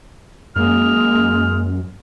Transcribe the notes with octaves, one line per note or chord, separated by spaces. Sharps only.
F#2 G#3 A#3 F6